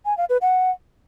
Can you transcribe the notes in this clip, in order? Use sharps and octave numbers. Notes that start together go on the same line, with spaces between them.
G#5
F5
B4
F#5